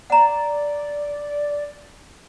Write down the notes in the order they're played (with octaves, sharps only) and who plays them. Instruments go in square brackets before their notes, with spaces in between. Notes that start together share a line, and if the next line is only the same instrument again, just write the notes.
[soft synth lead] D5 [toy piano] F#5 A#5